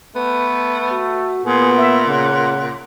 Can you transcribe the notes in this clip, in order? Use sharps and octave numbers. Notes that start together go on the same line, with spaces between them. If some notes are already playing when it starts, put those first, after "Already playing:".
A3 B3
F#4
A#2 B3 G#4
E5
C#3 F#5